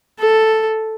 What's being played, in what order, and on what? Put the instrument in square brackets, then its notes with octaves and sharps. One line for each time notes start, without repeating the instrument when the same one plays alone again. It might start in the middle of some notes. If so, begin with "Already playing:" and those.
[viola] A4